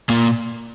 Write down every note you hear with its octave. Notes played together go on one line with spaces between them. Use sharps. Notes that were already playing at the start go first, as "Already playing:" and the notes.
A#2 A#3